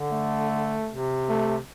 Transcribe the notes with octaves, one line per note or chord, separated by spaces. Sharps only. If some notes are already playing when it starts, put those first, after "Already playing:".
Already playing: D3
A3
C3
A3